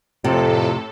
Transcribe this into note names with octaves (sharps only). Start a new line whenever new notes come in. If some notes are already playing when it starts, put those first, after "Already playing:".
F2 A2 C3 A4